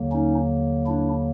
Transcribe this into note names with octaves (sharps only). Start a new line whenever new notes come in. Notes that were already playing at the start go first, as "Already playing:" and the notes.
Already playing: D#2 D3 F#3 A#3
C#4 D#4
D4 E4